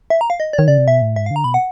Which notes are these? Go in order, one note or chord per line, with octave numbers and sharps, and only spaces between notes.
E5
A#5
F5
D#5
D5
D#3 C#5
C#3 D5
C3
B2 E5
A2
G#2 E5
F5
D3
A#5
B2 B5
F#5